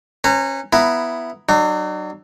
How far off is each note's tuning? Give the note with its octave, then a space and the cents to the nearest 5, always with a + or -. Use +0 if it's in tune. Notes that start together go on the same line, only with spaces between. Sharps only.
C#4 -20 B4 +20 A#5 -25
B3 +5 E4 +15 A#5 +0
F#3 +35 D#4 -45